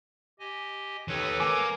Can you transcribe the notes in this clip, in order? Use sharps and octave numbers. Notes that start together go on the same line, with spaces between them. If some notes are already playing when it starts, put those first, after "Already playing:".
G4 D#5 G#5
D#3 G4 A4 B4 C#5
A#3 A#4 G#5 D6